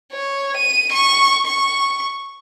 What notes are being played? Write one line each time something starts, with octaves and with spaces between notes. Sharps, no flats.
C#5
D#7
C#6
C#6